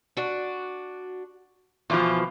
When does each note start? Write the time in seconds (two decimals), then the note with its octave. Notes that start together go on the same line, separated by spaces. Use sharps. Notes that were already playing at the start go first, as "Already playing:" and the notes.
0.17 D4 F#4
1.90 E2 B2 E3 F3 F4